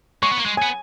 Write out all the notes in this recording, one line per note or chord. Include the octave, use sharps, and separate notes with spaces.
G#3 C#6
B3
A#3
G#3
B3 G#5